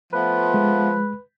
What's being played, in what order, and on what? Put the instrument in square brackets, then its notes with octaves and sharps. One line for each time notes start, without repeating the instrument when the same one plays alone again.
[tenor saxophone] F3 [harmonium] A3 B3 F4 [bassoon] B4
[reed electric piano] G#3